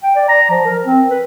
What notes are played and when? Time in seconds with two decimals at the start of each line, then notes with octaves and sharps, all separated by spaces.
0.03 G5
0.16 D5
0.29 A#5
0.50 F3
0.65 A#4
0.85 C4
1.10 B4